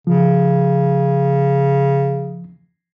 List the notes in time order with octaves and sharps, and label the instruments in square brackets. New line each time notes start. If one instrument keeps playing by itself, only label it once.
[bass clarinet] C#3 [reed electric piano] F3